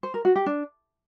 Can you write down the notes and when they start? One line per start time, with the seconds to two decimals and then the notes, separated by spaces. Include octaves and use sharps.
0.03 C5
0.14 A#4
0.25 F#4
0.36 G4
0.46 D4